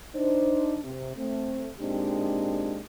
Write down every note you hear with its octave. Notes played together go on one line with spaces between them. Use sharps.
D4 D#4 C5
C3
A3 C4
A#2 G#3 C4 D4 D#4 G4